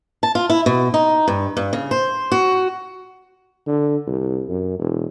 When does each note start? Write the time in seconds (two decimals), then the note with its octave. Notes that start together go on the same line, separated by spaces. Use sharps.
0.23 A5
0.35 F4
0.50 E4
0.66 B2
0.94 D#4
1.28 G2
1.57 G2
1.73 C#3
1.91 C5
2.32 F#4
3.67 D3
4.07 C2
4.49 F#2
4.79 E1